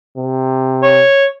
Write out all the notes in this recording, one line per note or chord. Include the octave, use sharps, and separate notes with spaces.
C3
C#5